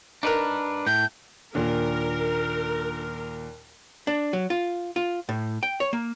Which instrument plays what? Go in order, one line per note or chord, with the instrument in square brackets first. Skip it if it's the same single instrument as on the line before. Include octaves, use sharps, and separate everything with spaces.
[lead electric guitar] D4 B4 [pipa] D#4 A#4
[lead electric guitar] A2 [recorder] G6
[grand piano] D#2 A#2 [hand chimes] D4 F4 [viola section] A#4
[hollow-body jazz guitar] D4
F#3
F4
F4
A2
G5
C#5
A#3